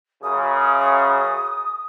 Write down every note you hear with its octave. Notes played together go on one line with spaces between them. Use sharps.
F#2 C#3 D#6